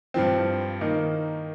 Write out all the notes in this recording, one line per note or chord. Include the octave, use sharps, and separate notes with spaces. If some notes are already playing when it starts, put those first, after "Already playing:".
G2 F3 C4
D#3 A#3 D#4